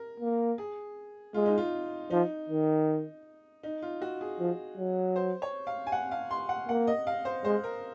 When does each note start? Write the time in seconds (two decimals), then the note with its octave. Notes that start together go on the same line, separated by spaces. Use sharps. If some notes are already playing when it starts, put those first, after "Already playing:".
Already playing: A#4
0.20 A#3
0.58 G#4
1.34 G#3 F4
1.46 D#4
1.58 F4
2.11 F3 D#4
2.49 D#3
3.63 D#4
3.82 F4
4.02 F#4
4.21 G#4
4.40 F3
4.77 F#3
5.16 C5
5.42 C#5
5.67 F5
5.87 G#5
5.92 F#5
6.11 F5
6.31 C6
6.49 F#5
6.69 A#3 F#5
6.87 D#5
7.07 F5
7.25 C5
7.45 G#3 C5
7.64 A#4